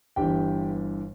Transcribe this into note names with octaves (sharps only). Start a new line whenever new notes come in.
G1 G2 E3 G4 G5